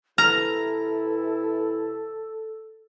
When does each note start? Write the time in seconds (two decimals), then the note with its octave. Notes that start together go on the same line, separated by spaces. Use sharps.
0.18 C3 E3 E4 A4 A#5 F6